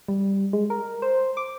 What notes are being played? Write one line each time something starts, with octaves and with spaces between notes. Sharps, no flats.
G3
G#3
A#4
C5
D6